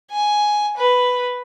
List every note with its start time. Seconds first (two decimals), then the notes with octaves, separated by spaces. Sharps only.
0.11 G#5
0.77 B4